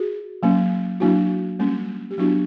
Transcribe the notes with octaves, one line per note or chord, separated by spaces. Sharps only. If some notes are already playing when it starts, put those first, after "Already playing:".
Already playing: F#4 G#4
F#3 A#3 C#4
F#3 A#3 D4 E4 F#4
G3 A#3 C#4
G4
F#3 B3 D4 E4 F#4